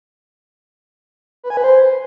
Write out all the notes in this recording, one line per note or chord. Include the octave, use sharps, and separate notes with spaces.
B4
G#5
B4
C5